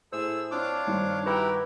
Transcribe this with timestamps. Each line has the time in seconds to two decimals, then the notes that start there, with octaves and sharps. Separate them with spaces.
0.13 A2 G#4 A4 C5 E6
0.51 C4 D4 F4 C#5 D6
0.87 G2 D#3
1.26 E4 F#4 G4 A#4 B4